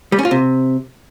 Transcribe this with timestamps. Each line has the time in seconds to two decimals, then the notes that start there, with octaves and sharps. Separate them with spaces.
0.12 G3
0.19 C#4
0.25 F4
0.31 C3